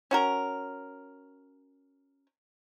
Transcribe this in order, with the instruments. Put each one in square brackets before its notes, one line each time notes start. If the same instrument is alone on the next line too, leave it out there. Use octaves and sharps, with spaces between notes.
[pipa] C#4 F#4 A#4